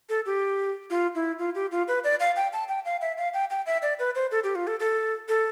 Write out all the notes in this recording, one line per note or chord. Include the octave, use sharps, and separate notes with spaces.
A4
G4
F4
E4
F4
G4
F4
B4
D5
F5
G5
A5
G5
F5
E5
F5
G5
G5
E5
D5
B4
C5
A4
G4
F4
A4
A4
A4